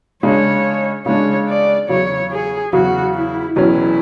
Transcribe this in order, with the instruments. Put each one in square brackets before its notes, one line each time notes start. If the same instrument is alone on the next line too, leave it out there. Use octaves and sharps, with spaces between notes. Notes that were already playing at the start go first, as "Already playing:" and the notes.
[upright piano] C#3 G#3 D4 [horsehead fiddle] C#5
[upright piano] C#3 G#3 D4 [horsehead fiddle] C#5
[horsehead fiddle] D5
[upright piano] E2 C#3 F#3 [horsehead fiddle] C#5
[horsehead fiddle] G#4
[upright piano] E2 C#3 F#3 [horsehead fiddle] F#4
[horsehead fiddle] E4
[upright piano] E1 E2 B2 F#3 C#4 [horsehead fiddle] E4